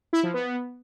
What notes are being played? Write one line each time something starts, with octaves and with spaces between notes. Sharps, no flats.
E4
F3
B3